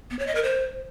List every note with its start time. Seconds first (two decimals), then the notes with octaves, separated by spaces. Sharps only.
0.11 B3
0.19 C#5
0.27 D#5
0.35 A#4
0.43 C5